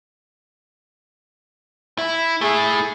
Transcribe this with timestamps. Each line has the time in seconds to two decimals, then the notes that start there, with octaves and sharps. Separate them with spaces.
1.98 E4
2.41 A3 E4 G#4